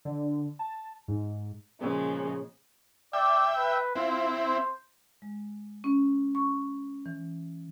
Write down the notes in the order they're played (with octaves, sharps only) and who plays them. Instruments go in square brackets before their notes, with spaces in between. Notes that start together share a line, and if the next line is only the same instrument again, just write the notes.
[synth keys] D3
A5
G#2
[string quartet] A#2 C#3 F3 G#3
[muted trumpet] D5 [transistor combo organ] E5 G5
[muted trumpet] B4
[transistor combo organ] C4 E4 [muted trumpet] F4
[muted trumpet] C5
[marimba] G#3
C#4
C#6
E3